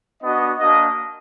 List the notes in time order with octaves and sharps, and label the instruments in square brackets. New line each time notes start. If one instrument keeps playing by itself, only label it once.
[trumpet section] B3 D4 F#4 D#5
A#3 D4 F#4 D#5